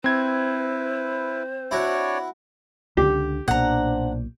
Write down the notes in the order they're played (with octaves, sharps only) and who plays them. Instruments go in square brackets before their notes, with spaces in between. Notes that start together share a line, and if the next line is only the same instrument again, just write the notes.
[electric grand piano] C4 G#6 [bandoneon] E4 B4 [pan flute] C5
[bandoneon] D4 C#5 D5 [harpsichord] E4 F#4
[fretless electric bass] C#2 D3 [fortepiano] G4
[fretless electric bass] B1 A#2 [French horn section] D4 C5 [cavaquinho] F#5 A#5